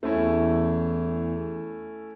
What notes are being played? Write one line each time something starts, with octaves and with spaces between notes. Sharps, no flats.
E2 A3 C#4 E4